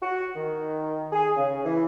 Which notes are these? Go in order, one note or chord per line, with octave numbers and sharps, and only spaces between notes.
F#4
D#3
G#4
C#3
E3